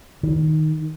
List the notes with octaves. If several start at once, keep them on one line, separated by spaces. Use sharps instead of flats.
D#3